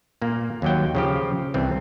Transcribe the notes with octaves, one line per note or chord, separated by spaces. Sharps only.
A#2 A#3
D#2 F#3 G5
C#3 F3 G4
C2 E3 C4